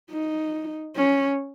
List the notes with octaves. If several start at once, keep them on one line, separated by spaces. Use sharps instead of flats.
D#4
C#4